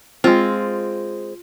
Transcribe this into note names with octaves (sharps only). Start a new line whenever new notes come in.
G#3 C4 F4